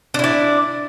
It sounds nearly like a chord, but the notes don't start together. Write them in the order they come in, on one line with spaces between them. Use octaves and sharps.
D4 E4 D5